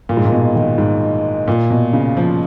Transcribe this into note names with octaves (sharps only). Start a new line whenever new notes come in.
A#2
G#2
A#2
B2
D#3
G#2
A#2
B2
C#3
F3